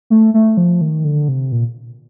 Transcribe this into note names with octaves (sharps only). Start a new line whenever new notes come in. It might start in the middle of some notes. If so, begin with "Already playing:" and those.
A3
A3
F3
D#3
D3
C3
A#2